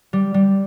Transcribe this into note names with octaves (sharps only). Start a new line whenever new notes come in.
G3
G3